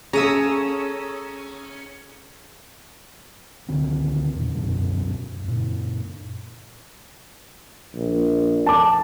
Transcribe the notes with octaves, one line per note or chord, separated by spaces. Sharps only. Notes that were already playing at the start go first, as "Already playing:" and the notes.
C#4 G#4 A4 F5 A#5 D#6 E6
C#2 D3 D#3 C4
E2 A#2
C#2 F#2 B2 F#3
F#2 A#2
A#1
A5 D6